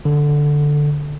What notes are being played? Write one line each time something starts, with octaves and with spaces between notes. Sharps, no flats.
D3